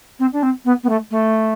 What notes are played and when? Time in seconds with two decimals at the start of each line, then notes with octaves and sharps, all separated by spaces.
0.19 C4
0.32 D4
0.42 C4
0.65 B3
0.83 B3
0.89 A3
1.11 A3